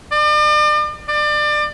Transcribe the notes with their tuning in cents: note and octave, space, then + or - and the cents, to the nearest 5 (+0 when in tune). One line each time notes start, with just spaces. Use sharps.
D5 +40
D5 +30